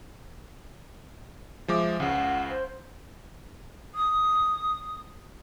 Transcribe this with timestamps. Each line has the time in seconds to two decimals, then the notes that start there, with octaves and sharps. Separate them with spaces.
1.68 F3 G#3 E5 D6
2.00 C#2 C#3 F#5
2.50 C5
3.95 D#6